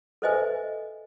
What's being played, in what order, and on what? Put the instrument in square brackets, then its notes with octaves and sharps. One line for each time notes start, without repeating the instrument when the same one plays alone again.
[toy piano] A4 B4 C5 D#5 E5 G#5